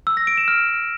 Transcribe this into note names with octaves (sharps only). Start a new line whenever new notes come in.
E6
A#6
D7
E7
F6